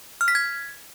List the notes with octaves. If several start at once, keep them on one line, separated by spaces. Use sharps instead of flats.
F6
B6
G#6